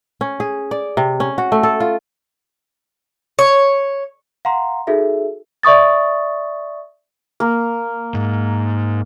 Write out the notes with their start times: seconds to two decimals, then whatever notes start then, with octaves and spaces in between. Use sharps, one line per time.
0.21 C#4
0.40 G#4
0.71 D5
0.97 C3
1.20 C#4
1.38 F#4
1.52 A3
1.63 A4
1.80 F4
3.39 C#5
4.45 F5 F#5 A#5 C6
4.87 D#4 F#4 G#4 A4 E5
5.63 D5 E5 C#6 D#6 A6
7.40 A#3
8.14 G#2